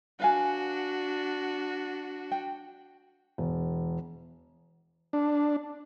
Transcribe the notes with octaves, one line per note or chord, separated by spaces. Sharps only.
D4 F#4 B4 F5 G#5
G5
E1
D4